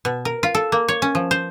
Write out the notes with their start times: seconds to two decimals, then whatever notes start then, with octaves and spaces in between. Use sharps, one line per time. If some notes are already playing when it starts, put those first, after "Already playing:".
0.05 B2
0.25 A#4
0.43 F4
0.55 A4
0.72 A#3
0.88 C#5
1.02 C#4
1.15 F3
1.31 C5